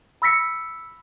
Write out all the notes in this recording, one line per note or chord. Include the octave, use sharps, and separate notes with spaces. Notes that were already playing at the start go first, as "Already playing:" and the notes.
B5 E6 A#6 B6 C#7